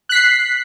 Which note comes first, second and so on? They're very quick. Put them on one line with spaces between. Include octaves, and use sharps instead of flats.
F#6 B6 C7